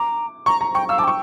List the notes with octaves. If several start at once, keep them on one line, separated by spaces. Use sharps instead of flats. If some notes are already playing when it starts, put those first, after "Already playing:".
Already playing: A#5 D6
A#5 C#6
A#5
G5 C#6
F5 E6
A5 D6
G5 C#6